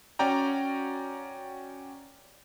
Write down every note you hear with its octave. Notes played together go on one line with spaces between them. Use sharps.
C#4 F#4 D5 G5 A#5